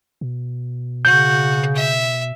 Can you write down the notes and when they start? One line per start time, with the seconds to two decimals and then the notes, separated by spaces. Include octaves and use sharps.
0.21 B2
1.05 C#3 F#4 G6
1.76 E5